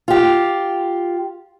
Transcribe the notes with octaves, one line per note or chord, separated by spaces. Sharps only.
F4 G4